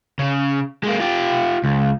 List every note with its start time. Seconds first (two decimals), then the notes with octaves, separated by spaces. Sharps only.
0.19 C#3
0.84 G#3 A#3
1.00 F4 G4
1.64 C#2